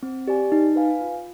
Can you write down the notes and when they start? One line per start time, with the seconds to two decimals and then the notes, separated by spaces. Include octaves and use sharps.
0.03 C4
0.27 G4 D5 G#5
0.52 D#4
0.76 B4 F5 G#5
1.01 F4